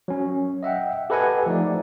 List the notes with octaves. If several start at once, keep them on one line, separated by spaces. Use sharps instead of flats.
F#3 C#4
D#5 E5 F#5 G5
G4 A4 B4 D#5 F#5 G#5
F3 A3 D#4 D5